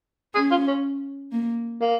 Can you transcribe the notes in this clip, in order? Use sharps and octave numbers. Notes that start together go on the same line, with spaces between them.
C#4 G#4
F4
C#4
A#3
A#3